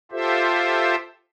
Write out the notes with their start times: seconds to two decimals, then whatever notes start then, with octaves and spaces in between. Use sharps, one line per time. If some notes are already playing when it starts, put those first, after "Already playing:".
0.12 F4 G4 A4 C5 E5